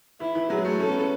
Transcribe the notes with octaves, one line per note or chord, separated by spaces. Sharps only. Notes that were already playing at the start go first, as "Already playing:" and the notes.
E3 E4
E3
F#3 G#4
G#3
A3
C#4 A4
B3
B3